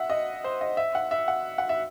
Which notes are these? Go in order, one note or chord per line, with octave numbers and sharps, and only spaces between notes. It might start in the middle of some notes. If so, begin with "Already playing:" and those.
Already playing: E5 F#5
D#5
C5
D#5
E5
F#5
E5
F#5
F#5
E5